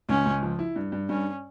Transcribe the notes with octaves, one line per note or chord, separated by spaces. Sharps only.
C#2 C#4
C#2
F3
E4
G2
G2
G2 C#4